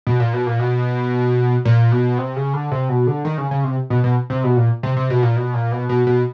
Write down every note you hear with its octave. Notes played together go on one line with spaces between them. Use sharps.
B2
A#2
B2
A#2
B2
A#2
B2
C3
C#3
D3
C3
B2
D3
D#3
C#3
C#3
C3
B2
B2
C3
B2
A#2
C3
C3
B2
A#2
B2
A#2
B2
B2
B2